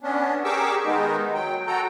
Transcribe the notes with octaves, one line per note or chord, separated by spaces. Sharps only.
B3 C#4 D4
G4 G#4 A#4 C#6 D6 E6
D#3 G#3 B3 D#4
F#3 G5
F#4 A4 G5 A#5